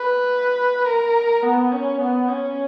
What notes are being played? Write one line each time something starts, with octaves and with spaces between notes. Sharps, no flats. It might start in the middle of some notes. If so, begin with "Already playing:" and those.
Already playing: B4
A#4
B3
C#4
B3
C#4